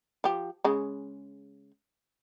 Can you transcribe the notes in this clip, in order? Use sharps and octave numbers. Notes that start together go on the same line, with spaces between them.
F3 G4
C#3 G#3